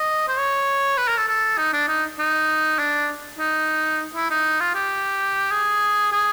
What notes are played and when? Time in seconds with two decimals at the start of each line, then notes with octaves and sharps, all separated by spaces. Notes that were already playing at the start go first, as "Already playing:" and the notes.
Already playing: D#5
0.28 C5
0.37 C#5
0.97 B4
1.08 A#4
1.17 A4
1.28 A4
1.57 D#4
1.73 D4
1.88 D#4
2.19 D#4
2.79 D4
3.39 D#4
4.15 E4
4.30 D#4
4.60 F4
4.75 G4
5.51 G#4
6.12 G#4